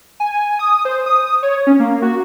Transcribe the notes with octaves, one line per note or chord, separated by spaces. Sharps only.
G#5
D#6
C5
D#6
C#5
C#4
A#3
F#4